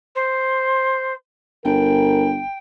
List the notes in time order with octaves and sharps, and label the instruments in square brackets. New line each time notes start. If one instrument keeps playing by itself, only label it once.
[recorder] C5
[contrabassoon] G1 [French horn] A#4 [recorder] G5